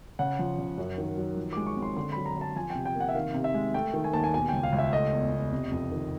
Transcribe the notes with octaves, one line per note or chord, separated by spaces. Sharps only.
C#3 F#5
F3
C#3
F#2
D#3
F#3
F3
G#3 D6
C#6
C4
C6
D3 C6
F#3 B5
A#5
D3
A5
F3 G#5
C3 G5
G5
A#3
F#5
E5
D#3 F5
C3
E5
G#3
A3 G5
D#3
G#5
D#2 A5
G#5
B2 G#5
C#2 G5
F5
C#2
E5
A3 D#5
E2
E2
C3
F2
D#3